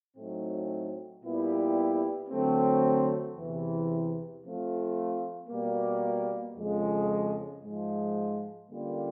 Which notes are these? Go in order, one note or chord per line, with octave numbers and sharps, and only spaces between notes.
A2 F#3 A3 C4 D#4
A#2 G3 B3 E4 G4
D3 F#3 A3 C4
E2 C3 E3
F3 A3 C4 F4
B2 G3 A#3
F2 C#3 F3 G#3
G#2 F3 G#3
D3 G3 A#3 C#4 F4